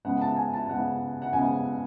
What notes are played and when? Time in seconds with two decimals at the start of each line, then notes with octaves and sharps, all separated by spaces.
0.05 C#2 C#3 G#3 B3 F#5
0.21 A5
0.37 G#5
0.54 A5
0.69 C#2 C#3 G#3 B3 F#5
1.22 F#5
1.33 C#2 C#3 G#3 B3 G#5